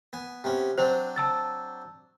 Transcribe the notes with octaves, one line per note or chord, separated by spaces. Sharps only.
B3 G#5
C3 B3 C#4
F#3 C4 D4 C5
A5 E6 A6